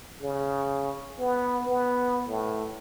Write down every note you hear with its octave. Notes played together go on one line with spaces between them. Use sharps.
C#3
B3
B3
A2